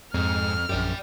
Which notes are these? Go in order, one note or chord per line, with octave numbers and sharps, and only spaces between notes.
F2 G#2 F6
A#1 F#2 G4 D5